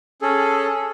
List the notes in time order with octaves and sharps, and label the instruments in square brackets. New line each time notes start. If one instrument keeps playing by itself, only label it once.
[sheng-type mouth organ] C#4 G#4 A4